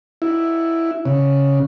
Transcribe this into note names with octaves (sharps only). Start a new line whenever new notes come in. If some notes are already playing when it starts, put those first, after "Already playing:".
E4
C#3